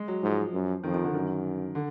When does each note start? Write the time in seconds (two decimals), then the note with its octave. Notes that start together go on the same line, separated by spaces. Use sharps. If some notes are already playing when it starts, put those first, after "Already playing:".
Already playing: G#3
0.08 F#3
0.22 G#2 F3
0.53 F#2
0.84 F2 D#3
0.90 F3
0.94 D#3
1.04 D3
1.14 F#2 D#3
1.75 D3